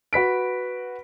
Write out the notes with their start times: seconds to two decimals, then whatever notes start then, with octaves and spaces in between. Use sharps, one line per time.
0.13 F#4 B4 B6 D7